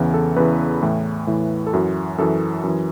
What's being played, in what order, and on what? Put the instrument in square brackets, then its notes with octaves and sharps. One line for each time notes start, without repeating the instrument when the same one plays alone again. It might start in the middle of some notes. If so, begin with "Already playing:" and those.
Already playing: [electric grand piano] E2 C#3 E3
A4
E2 C#3 E3 B4
A2 E3
A2 E3
A4
F#2 E3 F#4
F#2 E3 A4
F#2 E3